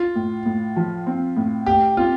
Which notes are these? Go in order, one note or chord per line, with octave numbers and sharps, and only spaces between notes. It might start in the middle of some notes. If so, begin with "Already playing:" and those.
Already playing: F4
A2
A2
F3
C4
A2
A2 G4
C4 F4